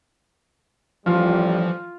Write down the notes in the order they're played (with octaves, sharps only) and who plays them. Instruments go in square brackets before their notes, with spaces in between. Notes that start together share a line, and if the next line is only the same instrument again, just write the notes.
[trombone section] A1 G3 [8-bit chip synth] E3 F3 [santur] F4